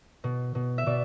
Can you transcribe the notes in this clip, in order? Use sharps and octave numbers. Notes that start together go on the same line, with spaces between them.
B2
B2
E5
B2 D5